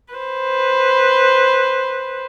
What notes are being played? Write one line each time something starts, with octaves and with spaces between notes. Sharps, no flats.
B4 C5